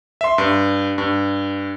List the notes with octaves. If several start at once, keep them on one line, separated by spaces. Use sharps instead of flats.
E5 C6
G2
G2